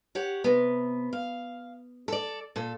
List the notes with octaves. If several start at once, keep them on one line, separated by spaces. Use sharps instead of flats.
G4 C#5 F#5
C3 B3
F5
A4 D5
A#2 A4